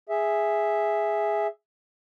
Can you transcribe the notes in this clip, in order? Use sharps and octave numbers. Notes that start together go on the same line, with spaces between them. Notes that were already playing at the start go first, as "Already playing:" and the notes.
G#4 E5